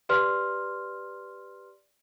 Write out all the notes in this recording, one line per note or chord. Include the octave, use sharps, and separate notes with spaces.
G4 B4 D5 C6 F6